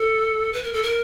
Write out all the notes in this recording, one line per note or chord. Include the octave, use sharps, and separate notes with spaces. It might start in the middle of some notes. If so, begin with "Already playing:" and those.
Already playing: A4
B4
A#4
A4
A#4